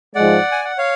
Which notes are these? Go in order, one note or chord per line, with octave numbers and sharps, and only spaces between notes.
G#2 F3 G#3 D5 F#5
G#5
F#5
C#5 F5